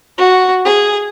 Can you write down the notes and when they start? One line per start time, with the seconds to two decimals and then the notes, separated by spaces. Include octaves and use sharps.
0.18 F#4
0.65 G#4